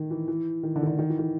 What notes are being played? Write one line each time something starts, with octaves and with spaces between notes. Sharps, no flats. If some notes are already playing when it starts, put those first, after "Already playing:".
Already playing: D#3
E3
E3
D#3
D3
D#3
D3
D#3
E3
D#3